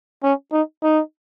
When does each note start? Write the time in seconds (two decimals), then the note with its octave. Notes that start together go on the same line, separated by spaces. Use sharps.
0.24 C#4
0.53 D#4
0.83 D#4